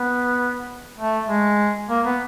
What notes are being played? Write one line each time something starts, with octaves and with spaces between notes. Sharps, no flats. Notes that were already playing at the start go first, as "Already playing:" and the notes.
Already playing: B3
A3
G#3
A#3
B3